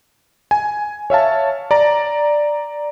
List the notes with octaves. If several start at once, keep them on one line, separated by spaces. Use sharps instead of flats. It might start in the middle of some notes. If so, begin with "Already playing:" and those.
G#5
C#5 E5 F5 A5
D5 A#5